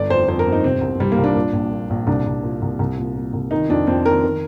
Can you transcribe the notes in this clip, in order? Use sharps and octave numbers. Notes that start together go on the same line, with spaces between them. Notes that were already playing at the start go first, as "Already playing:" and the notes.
Already playing: G1 D5
F2 C5
F2 C5
A#4
G1
D#4
C3 C4
C2
C2 G3
A#3
C2
D4
A#2
A#1
A#2
A#1
C2 D4
C2
A#2
C2
C2
A#2
A#2
C2
D#3 D#4
F2 D4
F2 C4
D#3 A#4
D#3